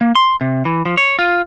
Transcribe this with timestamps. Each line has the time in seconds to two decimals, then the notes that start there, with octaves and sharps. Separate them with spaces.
0.01 A#3
0.15 C6
0.41 C3
0.65 E3
0.86 F3
0.97 C#5
1.19 F4